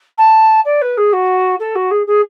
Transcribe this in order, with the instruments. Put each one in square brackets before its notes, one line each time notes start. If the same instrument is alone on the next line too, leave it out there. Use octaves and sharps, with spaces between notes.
[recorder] A5
D5
B4
G#4
F#4
A4
F#4
G#4
G#4